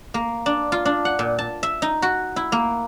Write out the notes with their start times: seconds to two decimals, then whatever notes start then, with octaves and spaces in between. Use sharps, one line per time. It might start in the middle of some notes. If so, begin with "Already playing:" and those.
0.14 A#3
0.46 D4
0.72 F4
0.85 D4
1.05 F#5
1.19 A#2
1.39 A5
1.63 E5
1.82 D#4
2.02 F#4
2.36 E4
2.52 A#3